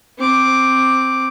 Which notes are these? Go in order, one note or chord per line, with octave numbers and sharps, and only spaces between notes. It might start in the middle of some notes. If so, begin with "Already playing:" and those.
C4 D6